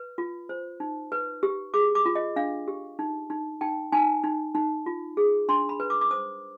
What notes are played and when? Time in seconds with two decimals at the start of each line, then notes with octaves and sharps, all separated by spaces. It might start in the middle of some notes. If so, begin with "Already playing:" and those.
Already playing: B4
0.18 F4
0.49 C5
0.80 D#4
1.12 B4
1.43 G4
1.74 G#4 D6
1.95 D6
2.06 F4
2.15 D#5
2.36 D4 F5
2.68 G4
2.99 D#4
3.30 D#4
3.61 D#4 G5
3.92 D#4 G#5
4.24 D#4
4.55 D#4
4.86 F4
5.17 G#4
5.49 D4 C6
5.69 B5
5.80 B4
5.90 D6
6.01 D6
6.11 C5 D#6